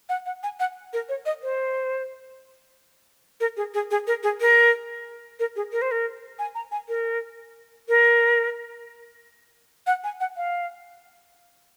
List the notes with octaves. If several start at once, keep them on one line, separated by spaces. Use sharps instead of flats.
F#5
F#5
G#5
F#5
A#4
C#5
D#5
C5
A#4
G#4
G#4
G#4
A#4
G#4
A#4
A#4
G#4
A#4
C5
A#4
G#5
A#5
G#5
A#4
A#4
F#5
G#5
F#5
F5